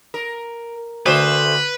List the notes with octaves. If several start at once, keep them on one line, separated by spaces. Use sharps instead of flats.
A#4
D2 A3 B4 C5